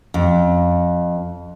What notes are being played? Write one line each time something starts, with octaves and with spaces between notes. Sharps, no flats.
F2